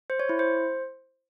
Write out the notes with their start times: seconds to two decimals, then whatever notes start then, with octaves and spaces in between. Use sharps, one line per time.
0.10 C5
0.19 C#5
0.29 E4
0.39 C5